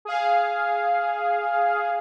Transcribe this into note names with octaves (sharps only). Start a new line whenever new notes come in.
G#4 F5